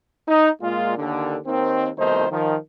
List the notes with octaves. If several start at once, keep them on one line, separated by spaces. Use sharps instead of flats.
D#4
A#2 G#3 F4
D#2 D3
D#2 D#3 C4
C2 B2 D#3 A3 D#4 C5
D#3 F3